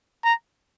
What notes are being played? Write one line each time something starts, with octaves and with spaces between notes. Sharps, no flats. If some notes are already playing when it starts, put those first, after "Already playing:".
A#5